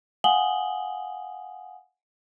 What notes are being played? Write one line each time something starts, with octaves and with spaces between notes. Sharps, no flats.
F5 F#5 G#5 D#6 F#7 G7